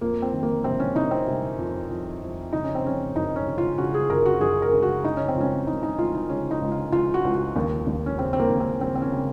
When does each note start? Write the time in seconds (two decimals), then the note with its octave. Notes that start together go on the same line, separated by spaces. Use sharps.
0.01 F2 A#3
0.22 C4
0.33 D#3
0.43 A#3
0.64 C3 C4
0.80 C#4
0.95 C3 D#4
1.11 C4
1.26 C3
1.58 F2
1.90 F2
2.22 F2
2.53 C#3 D#4
2.64 C#4
2.75 C4
2.85 C#3 C#4
3.15 F#2 D#4
3.36 C#4
3.47 C#3
3.58 F4
3.78 C#3 F#4
3.94 G#4
4.10 F#2 A#4
4.26 F#4
4.41 F#2 G#4
4.62 A#4
4.73 C#3
4.83 F#4
5.04 C#3 D#4
5.17 C#4
5.28 C4
5.36 C#2 C#4
5.67 C#2 D#4
5.83 D#4
5.98 C#2 F4
6.14 D#4
6.29 C#3 C#4
6.51 D#4
6.61 C#2
6.72 F4
6.92 C#2 F4
7.14 F#4
7.24 C#2
7.34 F#4
7.56 D#2
7.87 D#2
8.06 C#4
8.18 C#3 C4
8.33 C4
8.40 A#3
8.50 D#2
8.60 C4
8.81 C#3 C4
8.95 C4
9.02 C#4
9.12 C#3